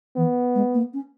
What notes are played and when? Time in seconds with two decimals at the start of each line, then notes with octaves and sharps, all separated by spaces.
0.16 E3 B3
0.55 G#3
0.74 A#3
0.93 C#4